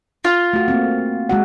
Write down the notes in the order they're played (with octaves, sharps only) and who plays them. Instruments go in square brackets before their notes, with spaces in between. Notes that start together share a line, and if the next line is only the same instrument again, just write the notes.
[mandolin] F4
[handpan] A3 F#4
A#3 C4
G#3 F#4 F#5